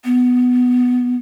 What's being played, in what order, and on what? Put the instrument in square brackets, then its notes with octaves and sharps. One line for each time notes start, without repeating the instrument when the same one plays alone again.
[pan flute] B3